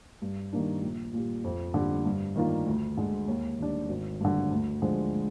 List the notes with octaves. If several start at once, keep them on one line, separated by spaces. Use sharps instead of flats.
G2
D#3 G3 A#3 D4
A#1
A#2 G3
F2
D3 G3
G2
D#3 A#3 D4 F4
D2
D3 G#3 D4
D#2
D#3 G3 D4
G#1
G2 D3
D2
D3 F3 G#3